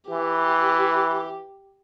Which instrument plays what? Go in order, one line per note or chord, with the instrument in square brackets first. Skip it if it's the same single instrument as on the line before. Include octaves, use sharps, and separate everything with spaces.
[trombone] E3 [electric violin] G4